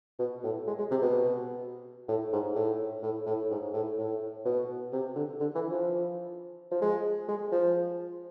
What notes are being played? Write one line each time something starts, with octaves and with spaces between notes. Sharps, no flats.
B2
A2
G#3
G#3
C3
B2
A2
G#2
A2
A2
A2
G#2
A2
A2
B2
C3
D3
D3
E3
F3
F3
G#3
G#3
F3